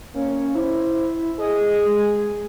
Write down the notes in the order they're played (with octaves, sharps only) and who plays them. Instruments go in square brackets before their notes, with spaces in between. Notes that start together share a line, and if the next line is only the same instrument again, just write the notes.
[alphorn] A#3 [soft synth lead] C#4
[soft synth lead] E4 [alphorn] C5
[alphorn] G#4 [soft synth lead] D#5
[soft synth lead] G#3